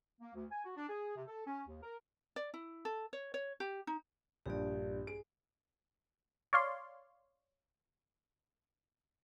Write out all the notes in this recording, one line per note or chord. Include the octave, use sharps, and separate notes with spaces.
A#3
D2
G#5
F#4
D4
G#4
C3
A4
C#4
D#2
A#4
D5
E4
A4
C#5
C#5
G4
D#4
A#1 G2 G4 D5
G#4 D7
C#5 D5 F5 C6